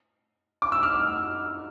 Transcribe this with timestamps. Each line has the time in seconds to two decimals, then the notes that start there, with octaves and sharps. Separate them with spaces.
0.62 D6
0.72 E6
0.83 F6